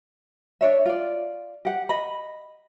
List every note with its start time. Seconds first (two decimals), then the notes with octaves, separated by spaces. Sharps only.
0.61 D4 C#5 E5
0.85 F4 D5
1.65 G4 F#5
1.89 D#5 B5